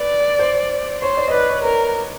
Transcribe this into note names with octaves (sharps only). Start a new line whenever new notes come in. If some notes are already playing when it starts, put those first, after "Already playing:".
Already playing: B4 D5
C5
C5 C#5
D5
D#5
B4 D5
C#5
A#4 B4